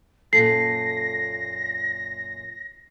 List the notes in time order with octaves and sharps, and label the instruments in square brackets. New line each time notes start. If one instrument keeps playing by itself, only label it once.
[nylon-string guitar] F#2 A#2 A4 [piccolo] A#6 [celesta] C7